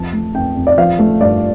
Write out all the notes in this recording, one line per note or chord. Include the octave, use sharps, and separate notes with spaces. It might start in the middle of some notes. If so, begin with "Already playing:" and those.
Already playing: F2 F3 A5
A3
F2 G5
F2
D5
F3 F5
A3
G2 D5